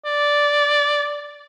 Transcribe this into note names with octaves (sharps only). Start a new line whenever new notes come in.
D5